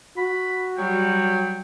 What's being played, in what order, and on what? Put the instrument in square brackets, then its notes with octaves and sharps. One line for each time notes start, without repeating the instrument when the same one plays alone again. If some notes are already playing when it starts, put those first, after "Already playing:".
[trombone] F#4 [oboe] B5
[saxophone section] F#3 [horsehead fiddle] G3 [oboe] G5